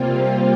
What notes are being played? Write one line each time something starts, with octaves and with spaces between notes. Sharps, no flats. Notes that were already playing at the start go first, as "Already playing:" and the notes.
Already playing: C3 G3 A#3 C4 F4